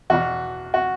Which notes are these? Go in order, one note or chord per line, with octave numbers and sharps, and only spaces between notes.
E2 B2 F#4
F#4